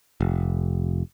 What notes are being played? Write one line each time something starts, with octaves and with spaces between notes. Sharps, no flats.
F1